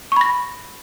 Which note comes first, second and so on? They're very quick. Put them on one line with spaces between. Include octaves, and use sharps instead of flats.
C#6 B5 A#6